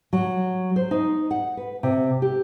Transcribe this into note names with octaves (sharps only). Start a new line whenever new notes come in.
F#3
C5
D#4
F#5
B4
C3
G4